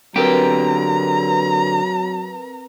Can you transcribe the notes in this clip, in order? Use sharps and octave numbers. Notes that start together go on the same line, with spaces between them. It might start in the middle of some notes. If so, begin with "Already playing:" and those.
D3 F#3 C4 G4 A#4 B4 G5 A#5